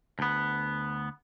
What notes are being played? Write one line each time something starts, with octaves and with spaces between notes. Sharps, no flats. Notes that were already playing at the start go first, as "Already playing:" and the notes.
D2 B3